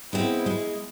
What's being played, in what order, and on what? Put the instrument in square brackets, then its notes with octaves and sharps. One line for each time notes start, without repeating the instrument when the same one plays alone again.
[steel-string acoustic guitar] G#3 B3 C4 [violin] E4
[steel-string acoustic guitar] G#3